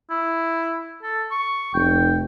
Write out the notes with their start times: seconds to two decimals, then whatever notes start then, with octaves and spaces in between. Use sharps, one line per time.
0.10 E4
1.02 A4
1.31 C#6
1.74 F1 G5